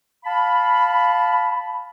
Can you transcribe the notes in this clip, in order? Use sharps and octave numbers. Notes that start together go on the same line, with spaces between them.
F5 A5 B5